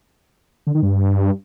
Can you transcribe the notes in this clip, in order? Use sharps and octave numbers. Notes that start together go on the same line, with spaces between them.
D3
D#3
G2